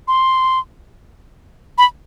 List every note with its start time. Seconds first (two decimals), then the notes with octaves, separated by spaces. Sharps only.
0.08 C6
1.78 B5